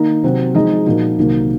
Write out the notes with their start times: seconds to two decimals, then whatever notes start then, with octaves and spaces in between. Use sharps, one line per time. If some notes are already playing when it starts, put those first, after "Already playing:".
Already playing: D#3 A#3 D#4
0.23 C3 F#3 C4 F#4
0.54 F3 G#3 D#4 G#4 D#5
0.86 A#2 F3 A#3 D#4 F#4
1.18 C2 C3 D#3 F#3 A#3